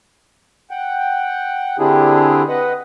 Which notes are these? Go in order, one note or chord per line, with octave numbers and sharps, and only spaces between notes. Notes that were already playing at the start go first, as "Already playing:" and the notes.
F#5 G5
D3 C4 D4 E4 G4 G#4
B4 D#5 F#5